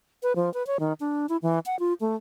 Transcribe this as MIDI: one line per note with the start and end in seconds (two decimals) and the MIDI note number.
0.23 0.33 71
0.36 0.52 53
0.54 0.66 71
0.67 0.78 73
0.80 0.93 51
1.00 1.26 62
1.29 1.37 64
1.42 1.59 52
1.66 1.79 78
1.79 1.94 65
2.01 2.16 57